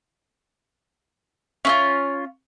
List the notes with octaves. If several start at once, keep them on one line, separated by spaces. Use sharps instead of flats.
C#4 E4 F4